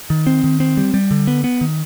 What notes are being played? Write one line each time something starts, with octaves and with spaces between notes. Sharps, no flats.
D#3
C4
D#3
C4
G3
G3
D3
B3
B3
D#3